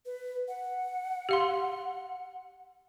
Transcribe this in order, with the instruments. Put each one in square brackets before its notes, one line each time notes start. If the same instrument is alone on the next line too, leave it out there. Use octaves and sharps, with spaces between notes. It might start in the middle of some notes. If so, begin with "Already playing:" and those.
[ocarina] B4
F#5
[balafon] G4 F5 C6